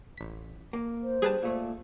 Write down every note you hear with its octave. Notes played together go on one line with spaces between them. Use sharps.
A1 B6
A#3
C5
G2 G3 G#4 B4 A5
A#2 A3